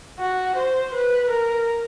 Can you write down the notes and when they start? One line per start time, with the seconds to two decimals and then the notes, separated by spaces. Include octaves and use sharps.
0.20 F#4
0.56 C5
0.94 B4
1.30 A#4